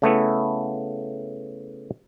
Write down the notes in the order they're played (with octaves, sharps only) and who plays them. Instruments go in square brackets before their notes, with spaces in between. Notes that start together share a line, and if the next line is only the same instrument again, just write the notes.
[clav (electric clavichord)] C#3 A3 B3 E4